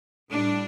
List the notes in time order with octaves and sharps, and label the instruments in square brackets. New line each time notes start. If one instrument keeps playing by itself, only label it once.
[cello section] A2 G3 D4